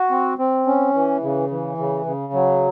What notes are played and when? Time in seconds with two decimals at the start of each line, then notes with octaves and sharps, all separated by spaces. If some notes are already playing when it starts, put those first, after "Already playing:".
Already playing: F#4
0.11 C4
0.38 C4
0.67 C#4
0.94 E3
1.22 C#3
1.51 E3
1.78 C#3
2.06 C#3
2.33 F#3